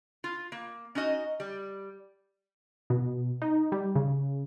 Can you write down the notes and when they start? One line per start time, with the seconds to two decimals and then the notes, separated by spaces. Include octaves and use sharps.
0.24 F4
0.52 A#3
0.95 C#4 D#4 F#4 D#5
1.40 G3
2.90 B2
3.42 D#4
3.72 G3
3.96 C#3